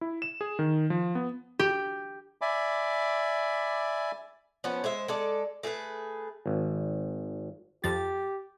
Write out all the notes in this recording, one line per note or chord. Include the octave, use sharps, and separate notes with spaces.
E4
E7
G#4
D#3
F3
B3
G4
D5 E5 G#5 B5 D6
F3 B3 C#4 B4
G#3 C5 E5
G#3 A4 D5
A3 G#4 A4 B4
G#1
F2 F3 G4 A6